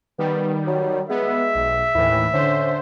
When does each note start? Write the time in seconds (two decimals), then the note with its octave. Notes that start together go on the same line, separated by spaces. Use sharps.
0.18 D#3 G3 B3
0.67 F#3
1.10 G#3 B3 E5
1.55 B1
1.95 D#2 A2 E3 E4
2.33 D3 C#4 C5